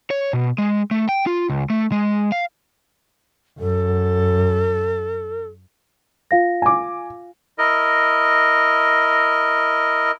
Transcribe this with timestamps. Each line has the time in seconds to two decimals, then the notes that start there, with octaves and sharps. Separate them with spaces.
0.10 C#5
0.33 B2
0.58 G#3
0.91 A3
1.09 G5
1.27 F4
1.50 C#2
1.70 A3
1.92 G#3
2.32 F5
3.59 F#2 A4
6.31 F4 F5 A#6
6.62 G#5 D6
7.58 E4 A#4 D#5